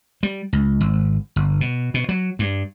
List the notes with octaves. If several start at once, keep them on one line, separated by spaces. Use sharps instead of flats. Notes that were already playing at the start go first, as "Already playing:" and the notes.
G3
C#2
G#1
G1
B2
B2
F#3
G2